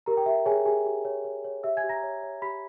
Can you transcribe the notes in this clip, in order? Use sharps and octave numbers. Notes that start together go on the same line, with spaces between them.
G4 A#4 A#5
G5
G4 E5
G#4 C#5 G#5
G4 G#4 G#5
G4
C#5
C#5
C#5
G4 E5 E6
G#5 G#6
G4
A#5 A#6
C#5
C#5
G4 B5 B6